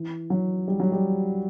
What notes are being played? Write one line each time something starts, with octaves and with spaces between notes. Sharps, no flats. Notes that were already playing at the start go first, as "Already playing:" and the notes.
Already playing: E3
F#3
G3
F#3
G3